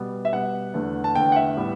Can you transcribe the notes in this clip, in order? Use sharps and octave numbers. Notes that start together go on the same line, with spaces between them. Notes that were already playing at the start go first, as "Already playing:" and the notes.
Already playing: B2 G3 B3
E5
B2 G3 B3 F#5
E2 D3 A3
A5
E2 D3 A3 G5
F#5
E5
A2 G3 B3